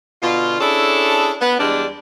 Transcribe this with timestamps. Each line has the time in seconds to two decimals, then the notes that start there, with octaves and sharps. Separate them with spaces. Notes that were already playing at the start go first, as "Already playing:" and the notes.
0.23 B2 D3 F4
0.60 C#4 D4 E4 G#4 A4
1.40 B3
1.60 E2 G3 G#3 D4